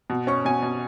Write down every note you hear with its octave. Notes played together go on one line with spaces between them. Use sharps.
B2
C#4 C#6
B2 G#5
B2